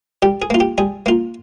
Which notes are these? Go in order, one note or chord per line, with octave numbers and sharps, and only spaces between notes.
G3 G4
G#4
A#3 F4
G4
G3 G#4
A#3 F4